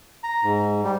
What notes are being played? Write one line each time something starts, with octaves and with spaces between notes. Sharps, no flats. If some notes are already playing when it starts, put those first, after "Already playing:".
A#5
G#2
G3